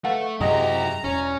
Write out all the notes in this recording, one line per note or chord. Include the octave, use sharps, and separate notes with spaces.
A3 A4 B4 F5 F#5
F#2 C3 F#3 E4 G4 G#4 D#5 A#5
E1 C#4